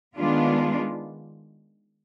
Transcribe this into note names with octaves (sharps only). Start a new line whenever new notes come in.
D#3 G#3 B3 D4 F4